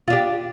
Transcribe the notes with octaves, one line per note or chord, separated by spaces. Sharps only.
D4 F4 G4